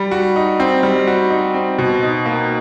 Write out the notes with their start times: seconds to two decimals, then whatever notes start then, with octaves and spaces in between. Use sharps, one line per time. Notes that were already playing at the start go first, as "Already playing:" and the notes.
Already playing: G3
0.11 F#4
0.36 D#4
0.60 C4
0.83 G3
1.07 F#4
1.30 D#4
1.54 C4
1.78 B2
2.02 D#4
2.26 A#3